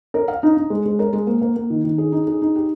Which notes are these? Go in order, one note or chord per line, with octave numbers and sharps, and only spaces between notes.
A#4
F5
D#4
D#4
G#3
G#3
A#4
G#3
A#3
A#3
A#3
D#3
D#3
G#4
D#4
G#4
D#4
G4